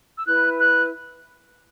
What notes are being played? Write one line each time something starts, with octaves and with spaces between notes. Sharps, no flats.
E6
E4 B4 F#6
F#6